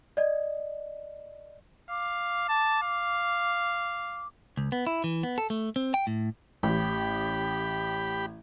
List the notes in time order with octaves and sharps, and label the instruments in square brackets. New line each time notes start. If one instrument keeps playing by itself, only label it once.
[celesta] D5 D#5
[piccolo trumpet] F5 [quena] D6
[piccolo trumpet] A5
F5
[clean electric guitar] C#2
B3
E4
E3
B3
A4
A3
C4
G5
A2
[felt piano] A1 [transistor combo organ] G4 B5